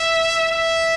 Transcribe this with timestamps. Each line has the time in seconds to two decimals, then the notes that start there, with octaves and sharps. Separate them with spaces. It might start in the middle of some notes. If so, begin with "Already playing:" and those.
Already playing: E5
0.52 E5